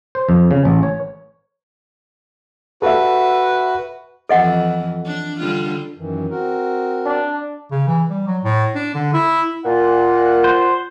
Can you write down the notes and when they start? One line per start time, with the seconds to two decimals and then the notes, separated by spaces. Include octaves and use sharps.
0.15 C5
0.29 F2
0.51 C#3
0.65 A1
0.83 C#5
2.82 F#4 A4 B4 E5
4.29 F2 E3 A4 D#5 F#5
5.06 D4
5.40 D3 G3 F4
5.97 F#2 D#3 E3
6.30 C4 F#4 A#4
7.06 D4
7.71 C#3
7.87 E3
8.10 G3
8.27 F#3
8.43 A2
8.75 D4
8.95 D3
9.13 E4
9.64 A#2 F4 F#5
10.44 C5